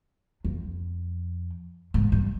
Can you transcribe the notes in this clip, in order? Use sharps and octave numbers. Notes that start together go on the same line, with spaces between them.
F2
G#2
G2